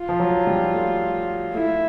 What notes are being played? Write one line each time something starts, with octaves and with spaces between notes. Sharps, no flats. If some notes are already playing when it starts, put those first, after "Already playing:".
Already playing: F4
F3
F#3
G3
A3
A3 E4